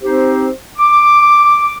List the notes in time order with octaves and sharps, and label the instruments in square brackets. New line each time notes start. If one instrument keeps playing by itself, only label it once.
[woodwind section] C4 D#4 G4 C5
D6